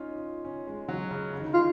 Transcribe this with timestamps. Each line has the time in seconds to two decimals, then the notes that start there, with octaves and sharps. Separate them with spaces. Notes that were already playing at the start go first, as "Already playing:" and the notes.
Already playing: C#4 D#4 F4
0.16 F4
0.45 C#4
0.67 G#3
0.88 F#3
1.11 C#3
1.33 C#3
1.40 D#3
1.46 C#3
1.54 F4